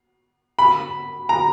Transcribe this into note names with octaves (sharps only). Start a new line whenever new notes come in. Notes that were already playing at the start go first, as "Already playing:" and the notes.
B5
A#5